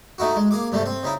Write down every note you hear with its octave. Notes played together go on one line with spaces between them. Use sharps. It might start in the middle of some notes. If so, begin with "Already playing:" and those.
A3 D#4 E4 F#4
G#3
A#3 G#4 D6
G2 C3 G3 A3
C4
C#3 D#4 E4